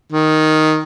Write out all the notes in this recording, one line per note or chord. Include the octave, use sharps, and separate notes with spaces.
D#3